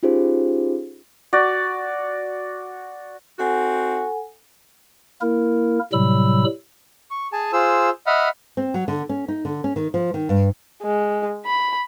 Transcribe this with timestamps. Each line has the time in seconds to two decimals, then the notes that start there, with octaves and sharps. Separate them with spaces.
0.03 C#4 D#4 F4 G4 G#4 C5
1.33 F#4 D5
3.39 C4 D#4 F#4 A4 F#5 G#5
5.21 A#3 E4 A#4
5.93 A2 C3 F#3 G3 B5 E6
7.11 C#6
7.33 G#4 G#5 A5
7.53 F4 G#4 C5 E6
8.07 D#5 E5 F#5 B5 F6
8.57 C4
8.74 F#3
8.88 D3
9.09 C#4
9.28 D#4
9.45 D3
9.64 C#4
9.76 D#3
9.94 F3
10.14 D#3
10.29 G2
10.82 G#3
11.46 B5